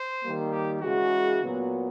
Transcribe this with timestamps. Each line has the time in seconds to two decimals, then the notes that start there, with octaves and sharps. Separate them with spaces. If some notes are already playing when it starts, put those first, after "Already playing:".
Already playing: C5
0.22 D#3 G3 A#3
0.52 G4
0.81 C#3 E3 G#3 F#4
1.41 A#2 F#3 B3